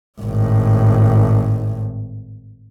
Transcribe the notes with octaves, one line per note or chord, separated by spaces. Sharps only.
G#1 A2